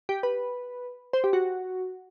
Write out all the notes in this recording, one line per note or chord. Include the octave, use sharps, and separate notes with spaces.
G4
B4
C5
G4
F#4